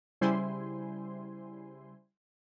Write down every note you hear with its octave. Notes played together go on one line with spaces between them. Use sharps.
C#3 G3 E4 C5 G#5 C6